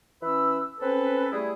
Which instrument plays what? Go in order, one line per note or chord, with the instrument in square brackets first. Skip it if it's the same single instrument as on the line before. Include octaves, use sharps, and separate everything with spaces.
[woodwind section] E3 C#4 B4 E6
C4 C#4 A4 B4
G3 A3 E4 G#4